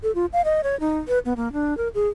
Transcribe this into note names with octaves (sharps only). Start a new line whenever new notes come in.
A4
F4
F5
D#5
C#5
D#4
B4
B3
A#3
D4
A#4
G#4